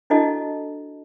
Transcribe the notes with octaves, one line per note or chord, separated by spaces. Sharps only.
D4 E4 F#4 A4 D#5 A5